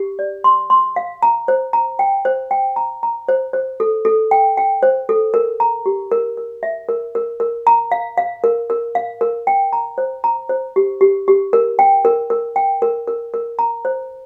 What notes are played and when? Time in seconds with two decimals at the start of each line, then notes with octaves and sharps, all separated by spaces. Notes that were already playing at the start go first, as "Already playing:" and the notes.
Already playing: G4
0.19 D5
0.44 C6
0.70 C6
0.96 F5
1.22 A#5
1.48 C5
1.73 A#5
1.99 G5
2.25 C5
2.51 G5
2.76 A#5
3.03 A#5
3.28 C5
3.53 C5
3.80 A4
4.05 A4
4.31 G5
4.57 G5
4.83 C5
5.09 A4
5.34 A#4
5.60 A#5
5.86 G4
6.12 A#4
6.37 A#4
6.63 E5
6.89 A#4
7.15 A#4
7.40 A#4
7.67 A#5
7.92 F5
8.18 F5
8.44 A#4
8.70 A#4
8.95 F5
9.21 A#4
9.47 G5
9.73 A#5
9.98 C5
10.24 A#5
10.49 C5
10.76 G4
11.01 G4
11.28 G4
11.53 A#4
11.79 G5
12.05 A#4
12.30 A#4
12.56 G5
12.82 A#4
13.08 A#4
13.34 A#4
13.59 A#5
13.85 C5